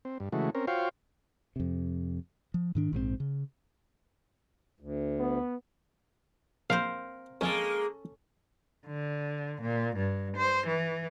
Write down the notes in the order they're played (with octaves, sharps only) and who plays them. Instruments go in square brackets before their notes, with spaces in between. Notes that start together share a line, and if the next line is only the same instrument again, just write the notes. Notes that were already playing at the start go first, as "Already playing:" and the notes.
[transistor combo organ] C4
G2
C#3 E3 G#3 A3 F#4
C4 C#4 A#4
F4 F#4 C5 C#5 F5 G5
[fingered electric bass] F2 C3
F3
G#2 D#3 D4
A#1 G#2 D#3 C4
C#3
[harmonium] D2
[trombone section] B3
[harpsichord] A#1 B5 [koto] C4 A#4 C5 [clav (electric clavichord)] F5
[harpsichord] F2 [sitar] G#3 A#3 [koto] C#4 A4
[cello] D3
A#2
G2
C5
E3